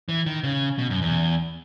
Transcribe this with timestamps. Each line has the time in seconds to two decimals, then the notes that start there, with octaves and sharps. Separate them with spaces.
0.09 E3
0.26 D#3
0.44 C#3
0.78 B2
0.90 F#2
1.02 E2